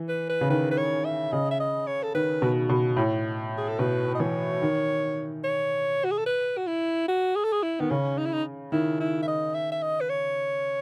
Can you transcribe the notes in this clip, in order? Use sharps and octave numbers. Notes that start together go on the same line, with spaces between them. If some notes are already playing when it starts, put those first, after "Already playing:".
Already playing: E3
B4
B4
C#3
D#3 B4
B4
C#5
E5
C#3 D#5
E5
D#5
C#5
A4
D#3 B4
B2
B2
A2
G#4
A4
B2 B4
D#5
E3 C#5
D#3
C#5
F#4
G#4
A4
B4
F#4
E4
F#4
G#4
A4
G#4
E4
D#3 B3
C#3 C#4
D#4
E4
D#4
D#3 E4
E4
E5
D#5
E5
E5
D#5
B4
C#5